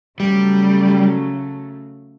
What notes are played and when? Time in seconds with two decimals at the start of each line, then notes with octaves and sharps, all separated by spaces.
0.19 C#3 F#3 G3 A3